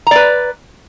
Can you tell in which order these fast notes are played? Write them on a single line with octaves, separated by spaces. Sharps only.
A#5 D5 B4